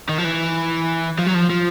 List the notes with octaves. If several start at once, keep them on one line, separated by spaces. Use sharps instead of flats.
D#3
F3
E3
F3
F#3
F3
F3